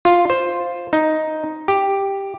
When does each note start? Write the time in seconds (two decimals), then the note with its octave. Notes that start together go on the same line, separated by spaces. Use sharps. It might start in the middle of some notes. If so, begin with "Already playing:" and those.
0.05 F4
0.30 C5
0.93 D#4
1.68 G4